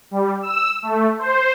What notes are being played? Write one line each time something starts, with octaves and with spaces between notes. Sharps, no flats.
G3
E6
A3
C5